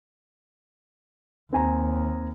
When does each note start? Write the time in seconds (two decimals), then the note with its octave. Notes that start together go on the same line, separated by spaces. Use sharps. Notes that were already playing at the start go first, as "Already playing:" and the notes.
1.53 D#2 C4 G#5 A#5